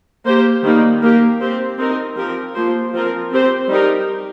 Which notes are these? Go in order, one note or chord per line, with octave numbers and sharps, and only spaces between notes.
A#3 G4 C5
D#3 G3 A#3 D#4
A#3 G4 A#4
C4 G4 C5
C4 D#4 A#4
F3 C4 G4 A#4
F3 A#3 F4 C5
F3 C4 F4 A#4
C4 G4 C5
G3 D#4 G4 A#4